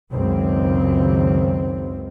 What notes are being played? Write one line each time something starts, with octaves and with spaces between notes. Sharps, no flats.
C#2 F#2 D#3 C4